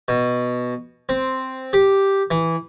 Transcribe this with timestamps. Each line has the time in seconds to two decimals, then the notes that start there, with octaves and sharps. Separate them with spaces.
0.08 B2
1.09 C4
1.73 G4
2.31 E3